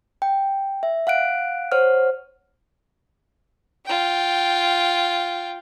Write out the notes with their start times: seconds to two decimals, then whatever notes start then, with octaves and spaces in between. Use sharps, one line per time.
0.22 G5
0.83 E5
1.07 F5 F#5 F#6 D7
1.72 C5 C#5 F#5 F6
3.85 F4 G5